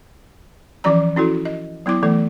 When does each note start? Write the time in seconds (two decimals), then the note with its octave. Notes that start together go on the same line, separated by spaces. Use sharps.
0.84 E3 F3 C#4 D5 A#5
1.16 C#4 E4 F#4 A4
1.45 D#5
1.86 F#3 B3 E4 D6
2.03 E3 A3 A4